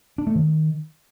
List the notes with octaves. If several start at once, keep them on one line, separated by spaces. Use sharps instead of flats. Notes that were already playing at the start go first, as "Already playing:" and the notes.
D4
A3
D#3